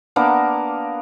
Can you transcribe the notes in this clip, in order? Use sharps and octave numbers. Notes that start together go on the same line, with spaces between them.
A#3 B3 D4 A#4